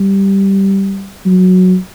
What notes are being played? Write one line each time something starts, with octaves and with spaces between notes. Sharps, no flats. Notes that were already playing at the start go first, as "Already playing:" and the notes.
Already playing: G3
F#3